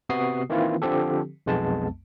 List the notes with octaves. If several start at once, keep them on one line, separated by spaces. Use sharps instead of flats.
C3 B3 F#4 D#6 C7
D#3 E3 A#3 C4 E4 F4
D3 F3 C4 G4 A4
B1 F2 G#3 B3 A5